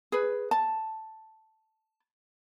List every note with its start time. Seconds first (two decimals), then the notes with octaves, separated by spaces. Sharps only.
0.12 G#4 B4
0.51 A5